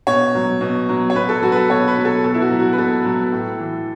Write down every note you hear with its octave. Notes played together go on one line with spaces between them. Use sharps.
B2 C#5
F#3
B2
F#3
C#5
B2 B4
A4
F#3 F#4
B4
A4
B2 C#5
B4
F#3
A4
B2 A4
E4
F#4
F#3
F#4
B4
B2 A4
F#3
A2
E3